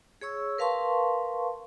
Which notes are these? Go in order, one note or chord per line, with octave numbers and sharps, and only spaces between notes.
G#4 C#5 C#6 E6
A#4 B4 F5 A5 C6 C#6